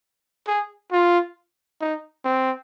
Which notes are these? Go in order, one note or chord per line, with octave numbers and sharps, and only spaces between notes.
G#4
F4
D#4
C4